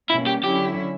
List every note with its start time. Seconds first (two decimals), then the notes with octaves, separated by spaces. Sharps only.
0.10 B2 G3 A#3 C#4 E4
0.27 G4
0.44 D3 F#3 C#4 E4 G4